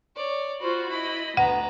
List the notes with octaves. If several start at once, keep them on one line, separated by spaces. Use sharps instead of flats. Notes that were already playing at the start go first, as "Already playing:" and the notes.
C#5 D5
F4 F#4 C5 B5
E4 D#5 B5
D2 B3 B4 F#5 A#5